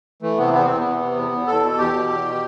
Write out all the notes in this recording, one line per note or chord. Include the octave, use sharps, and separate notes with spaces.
E3 A3
C3 B3
E2 B3
E2 C4
B3
E3
C3
E2
E2
E2 A4
B2
E2 G4
B2
E2
B2